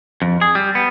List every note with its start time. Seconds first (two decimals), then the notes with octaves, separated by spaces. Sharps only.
0.22 F2
0.41 G#4
0.55 G3
0.75 B3